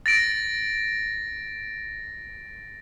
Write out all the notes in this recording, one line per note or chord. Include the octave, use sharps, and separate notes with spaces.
A6 A#6 D7